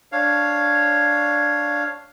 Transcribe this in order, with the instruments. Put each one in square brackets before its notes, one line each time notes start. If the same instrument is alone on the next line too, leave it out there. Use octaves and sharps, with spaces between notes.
[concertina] D4 C#5 F5